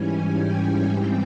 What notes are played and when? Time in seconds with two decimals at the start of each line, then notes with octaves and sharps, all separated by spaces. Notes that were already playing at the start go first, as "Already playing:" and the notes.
Already playing: G#2 E3 G3 C#4 G#5
0.38 G5
0.86 G#2 E3 G3 C4 G5